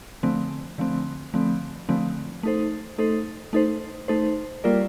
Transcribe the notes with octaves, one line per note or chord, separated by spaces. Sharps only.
D3 F3 A3 C4
D3 F3 A3 C4
D3 F3 A3 C4
D3 F3 A3 C4
A3 D#4 A4 C5
A3 D#4 A4 C5
A3 D#4 A4 C5
A3 D#4 A4 C5
G3 A#3 F4 A#4 D5